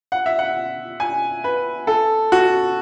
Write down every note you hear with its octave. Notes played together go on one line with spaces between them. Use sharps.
F#5
E5
F#5
G#5
B4
A4
F#4